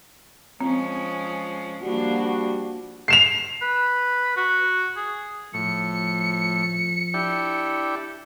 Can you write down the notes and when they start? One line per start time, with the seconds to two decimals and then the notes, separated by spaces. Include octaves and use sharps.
0.61 F3 G#3 C4 C#4
1.83 F3 G3 A#3 D4 F#4
3.08 C7 E7 F7
3.62 B4
4.36 F#4
4.96 G#4
5.54 A2 F3 C#7
7.14 D4 E4 G4